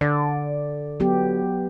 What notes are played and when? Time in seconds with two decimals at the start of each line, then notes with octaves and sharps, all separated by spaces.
0.01 D3 D5
1.00 F#3 B3 G4